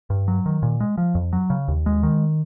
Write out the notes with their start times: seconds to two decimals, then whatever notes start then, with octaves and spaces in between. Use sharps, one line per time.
0.10 G2
0.28 F#3
0.46 D#3
0.63 A#2
0.80 G#3
0.98 F3
1.15 F2
1.33 F#3
1.50 C#3
1.68 D#2
1.86 G#3
2.03 D#3